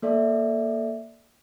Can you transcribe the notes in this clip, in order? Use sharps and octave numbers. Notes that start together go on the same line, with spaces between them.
A#3 A4 D5 E5